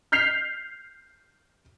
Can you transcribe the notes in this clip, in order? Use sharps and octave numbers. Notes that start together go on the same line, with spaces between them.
F6 G6 B6 C7 F7